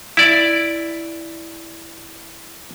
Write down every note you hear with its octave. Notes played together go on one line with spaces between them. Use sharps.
E4 D5